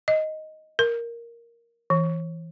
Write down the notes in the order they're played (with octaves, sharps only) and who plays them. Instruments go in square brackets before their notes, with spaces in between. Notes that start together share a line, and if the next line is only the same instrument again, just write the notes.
[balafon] D#5
A#4
E3